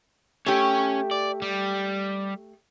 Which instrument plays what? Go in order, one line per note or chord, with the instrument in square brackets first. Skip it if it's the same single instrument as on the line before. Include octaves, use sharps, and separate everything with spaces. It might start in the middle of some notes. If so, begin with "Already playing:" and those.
[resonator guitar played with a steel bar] A3 G4 [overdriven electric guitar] C#4 C#5
[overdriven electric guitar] D5
G3